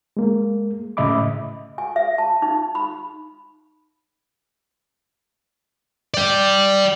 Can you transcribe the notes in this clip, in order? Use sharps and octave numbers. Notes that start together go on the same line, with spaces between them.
G#3 A#3
A2 C#3 D#5 E5 B5 D6
G#5
E5
A5
D#4
B5
D5 G5